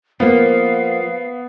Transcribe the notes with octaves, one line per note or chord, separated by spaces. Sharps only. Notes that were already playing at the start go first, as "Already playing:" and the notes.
F3 A#3 B3 F5